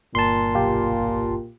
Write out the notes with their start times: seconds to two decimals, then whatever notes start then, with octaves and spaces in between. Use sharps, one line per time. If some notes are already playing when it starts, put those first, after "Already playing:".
0.15 G1 A#2 A5 C6
0.54 B1 F4 G4